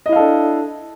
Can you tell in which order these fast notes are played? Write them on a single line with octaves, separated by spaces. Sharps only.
D#5 E4 F5 A4 D4